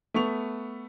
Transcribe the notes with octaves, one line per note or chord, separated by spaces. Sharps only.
A3 B3 C#6 F7